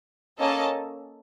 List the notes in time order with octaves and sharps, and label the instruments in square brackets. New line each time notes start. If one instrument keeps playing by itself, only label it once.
[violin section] A#3 C#4 A4 D#5 A5